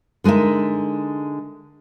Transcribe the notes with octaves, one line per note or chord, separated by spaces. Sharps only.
D3 G#3 D#4 A#4 E5